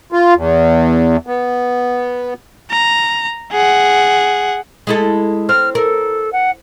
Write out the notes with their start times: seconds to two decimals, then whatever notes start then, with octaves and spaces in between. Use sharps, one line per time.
0.12 F4
0.34 E2
1.27 B3
2.70 A#5
3.52 G#4 F#5
4.87 G#3 E4 A4
5.49 C4 F6
5.75 A4 A#4
6.33 F#5